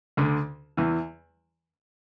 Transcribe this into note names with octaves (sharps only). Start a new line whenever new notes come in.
D2 D3
E2 E3